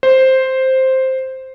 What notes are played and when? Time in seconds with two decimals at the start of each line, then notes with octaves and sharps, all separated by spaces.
0.03 C5